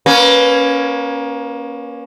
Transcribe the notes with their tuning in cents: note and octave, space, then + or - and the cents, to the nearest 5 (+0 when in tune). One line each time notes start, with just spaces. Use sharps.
A#3 +25 C#4 +0 B4 +0